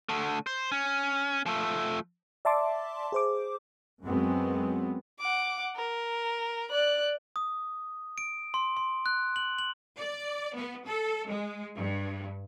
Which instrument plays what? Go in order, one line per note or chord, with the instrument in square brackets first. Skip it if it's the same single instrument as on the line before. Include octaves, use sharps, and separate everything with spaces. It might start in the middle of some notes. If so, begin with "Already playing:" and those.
[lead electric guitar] D3 A3
C5
C#4
F3 A3
[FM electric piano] D5 E5 A5 C6 D6
G#4 C5 D6
[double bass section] F#2 F#3 G#3 B3 C4
[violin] F#5 D6
A#4
D5 F#6
[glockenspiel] D#6
D7
C6
C6
F#6
F#7
F#7
[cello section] D5
B3
A4
G#3
G2